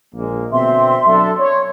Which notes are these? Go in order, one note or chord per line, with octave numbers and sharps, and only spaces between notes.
A#1 G#3 A#3
B2 D3 C4 E5 C6
F#3 D4 A4
C#5